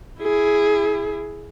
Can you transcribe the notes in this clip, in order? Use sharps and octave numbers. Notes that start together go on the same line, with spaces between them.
E4 G#4